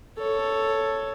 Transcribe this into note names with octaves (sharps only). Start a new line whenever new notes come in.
A4 C#5